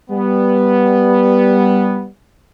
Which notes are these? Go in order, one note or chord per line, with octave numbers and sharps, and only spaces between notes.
G3 B3